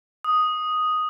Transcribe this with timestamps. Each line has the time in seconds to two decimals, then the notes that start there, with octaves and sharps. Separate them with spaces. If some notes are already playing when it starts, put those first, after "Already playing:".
0.24 D#6